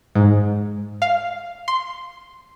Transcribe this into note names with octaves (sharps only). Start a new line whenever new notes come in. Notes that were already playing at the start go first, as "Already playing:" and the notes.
G#2
F5
C6